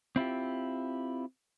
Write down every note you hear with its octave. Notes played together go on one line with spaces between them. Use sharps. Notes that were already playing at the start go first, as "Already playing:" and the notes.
C4 E4 F4 G4